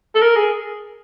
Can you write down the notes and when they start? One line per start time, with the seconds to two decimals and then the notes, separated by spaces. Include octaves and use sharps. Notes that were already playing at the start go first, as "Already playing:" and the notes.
0.15 A4
0.22 A#4
0.36 G#4